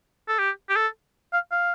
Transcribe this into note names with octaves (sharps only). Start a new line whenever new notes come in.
A4
G4
G4
A4
F5
F5